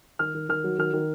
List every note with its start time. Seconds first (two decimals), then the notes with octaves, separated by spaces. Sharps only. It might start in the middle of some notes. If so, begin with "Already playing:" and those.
0.19 D#3 F6
0.35 D#3
0.49 D#3 F6
0.64 F#3
0.79 D#3 F6
0.93 D#3